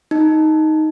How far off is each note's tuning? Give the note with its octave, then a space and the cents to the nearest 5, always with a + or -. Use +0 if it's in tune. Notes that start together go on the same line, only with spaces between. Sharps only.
D#4 +5